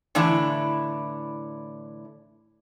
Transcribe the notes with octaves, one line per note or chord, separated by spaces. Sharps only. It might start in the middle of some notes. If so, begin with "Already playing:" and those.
A2 D3 E3 D4 E4